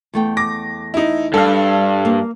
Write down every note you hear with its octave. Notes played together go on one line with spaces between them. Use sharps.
E2 A3 G5
D6 A#6
D#4 E4
G2 A4 F5
A#3